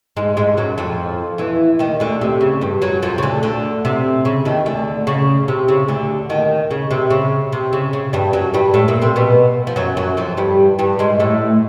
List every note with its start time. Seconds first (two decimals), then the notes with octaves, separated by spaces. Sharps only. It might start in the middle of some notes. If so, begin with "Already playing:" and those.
0.17 G#2 G#3
0.37 G#2 G#3
0.57 F#2 F#3
0.78 F2 F3
1.38 E2 E3
1.79 D#2 D#3
2.00 D2 D3
2.21 C3
2.41 C#3
2.61 G2 G3
2.82 F#2 F#3
3.02 F2 F3
3.18 C#3
3.23 D2 D3
3.43 D2 D3
3.85 C3
4.25 C#3
4.45 D#2 D#3
4.66 D2 D3
5.07 C#3
5.48 C3
5.68 C#3
5.88 D2 D3
6.29 D#2 D#3
6.71 C#3
6.91 C3
7.10 C#3
7.52 C3
7.73 C#3
7.93 C#3
8.13 G2 G3
8.33 F#2 F#3
8.54 G2 G3
8.74 A2 A3
8.88 A#2 A#3
9.02 C3 C4
9.16 B2 B3
9.67 F3
9.76 F#2 F#3
9.97 F#2 F#3
10.17 F2 F3
10.37 G2 G3
10.79 G2 G3
10.99 G#2 G#3
11.20 A2 A3